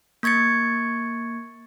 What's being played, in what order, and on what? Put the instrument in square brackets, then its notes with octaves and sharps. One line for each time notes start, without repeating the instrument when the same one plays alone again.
[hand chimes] A#3 C#6 G#6 A6 C#7